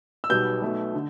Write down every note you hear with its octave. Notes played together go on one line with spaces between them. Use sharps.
E6
B1 B2 G3 B3 G6
B1 B2 A3
D3